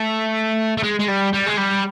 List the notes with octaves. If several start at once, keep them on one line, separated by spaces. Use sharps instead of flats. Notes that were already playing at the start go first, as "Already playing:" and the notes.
Already playing: A3
A3
G#3
G#3
G3
G3
G#3
G3